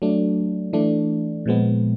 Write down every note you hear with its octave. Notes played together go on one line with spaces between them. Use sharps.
F#3 A3 D4
E3 A3 D4
A#2 F3 G#3 B3